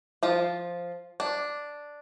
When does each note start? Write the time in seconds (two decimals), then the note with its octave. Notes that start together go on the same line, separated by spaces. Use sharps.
0.23 F3 F4
1.20 D4